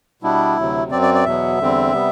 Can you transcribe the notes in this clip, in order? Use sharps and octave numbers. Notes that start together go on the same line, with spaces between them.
B2 G3 B3 D4 E4
D2 C3 F#3
F#2 F#3 C4 D5
D5
D5
E2 B2 F#3 B3 E5
E2 D3 G3 C4
C3 G3 B3